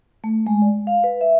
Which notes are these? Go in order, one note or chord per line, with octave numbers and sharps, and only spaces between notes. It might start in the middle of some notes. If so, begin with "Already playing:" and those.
A3
G#3
D5
F5
B4
E5